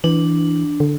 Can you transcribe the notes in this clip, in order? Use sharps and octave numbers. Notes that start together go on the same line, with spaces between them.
E3 D4
D3